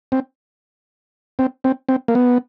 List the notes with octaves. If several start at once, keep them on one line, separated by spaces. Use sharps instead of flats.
C4
C4
C4
C4
A#3
B3